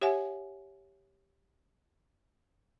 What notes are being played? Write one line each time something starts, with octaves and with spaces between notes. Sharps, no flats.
G4 C#5 E5 F#5 G#5